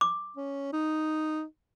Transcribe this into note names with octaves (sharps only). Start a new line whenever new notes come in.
D6
C#4
D#4